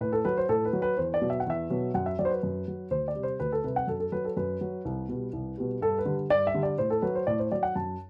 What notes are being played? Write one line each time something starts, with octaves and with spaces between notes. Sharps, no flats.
A2 B4
A4
F#3 B4
C5
A2 A4
B4
F#3
B4
E2 C5
D5
B2 F#3
E5
F#5
E2 E5
B2 F#3
F#2 F#5
E5
F#3 D5
C5
B4
F#2
F#3
D2 C5
D5
C3 G3
C5
D2 B4
A4
C3 G3 B4
F#5
F#2 A4
A4
F#3 B4
A4
F#2 B4
F#3
C2
B2 G3
C2
B2 G3
G2 A4
B4
D3 G3
G2 D5
E5
D3 G3
D5
A2 C5
A4
F#3 B4
C5
A2 D5
C5
F#3 D5
F#5
F#2 A5